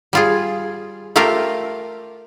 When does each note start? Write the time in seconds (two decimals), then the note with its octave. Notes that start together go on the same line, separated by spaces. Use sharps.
0.13 G3 F4 G#4
1.16 A3 F4 G4 A#4 F5